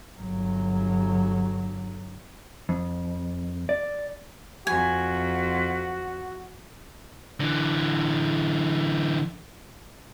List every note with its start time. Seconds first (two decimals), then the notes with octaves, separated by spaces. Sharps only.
0.18 G1 F#3
2.69 F2
3.69 D5
4.67 F2 F#4 G#5
7.40 D3 E3